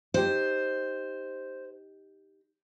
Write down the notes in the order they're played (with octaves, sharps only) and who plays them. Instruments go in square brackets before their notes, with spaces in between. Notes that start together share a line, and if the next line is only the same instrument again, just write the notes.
[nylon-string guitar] D#4 G4 [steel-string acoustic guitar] C5